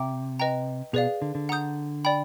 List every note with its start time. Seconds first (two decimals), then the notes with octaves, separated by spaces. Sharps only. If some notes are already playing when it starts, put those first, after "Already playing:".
Already playing: C3 E5 G5 A#5 D6
0.39 B4 D#5 G5 A#5
0.93 B2 G#4 B4 D5 F5
1.22 D3
1.35 D3
1.49 F#5 A#5 D#6 G6
2.05 D5 G5 B5